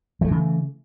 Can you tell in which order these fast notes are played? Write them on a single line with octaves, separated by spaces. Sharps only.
F3 A3 E3 C#3